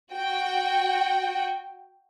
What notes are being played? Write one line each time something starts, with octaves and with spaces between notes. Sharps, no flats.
F#4 G5